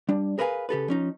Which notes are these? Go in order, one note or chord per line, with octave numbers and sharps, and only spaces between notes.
G3 D4
G#4 A#4 B4 D#5 F5 G#5
C#3 G4 A4 B4
F3 C#4 D#4